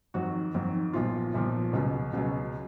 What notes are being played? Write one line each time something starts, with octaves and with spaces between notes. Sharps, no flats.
F2 D#3 F#3 F#4
F2 D#3 F#3
B1 A#2 F3 F4
B1 A#2 F3
C#2 B2 F#3
C#2 B2 F#3 F#4